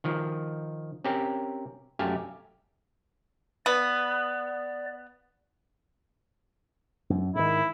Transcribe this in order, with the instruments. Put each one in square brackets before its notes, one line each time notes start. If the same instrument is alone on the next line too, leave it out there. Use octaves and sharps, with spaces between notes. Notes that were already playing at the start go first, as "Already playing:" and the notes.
[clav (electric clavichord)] D#3 F3
C4 C#4 G4 A#4
F#2 A3 G4 F5 G#5
[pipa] B3 [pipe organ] D5
[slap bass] F#2
[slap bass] G#2 D#3 [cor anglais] E4